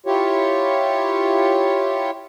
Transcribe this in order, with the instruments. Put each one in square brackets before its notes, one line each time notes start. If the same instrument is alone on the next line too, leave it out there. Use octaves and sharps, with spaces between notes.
[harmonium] E4 F4 G4 C#5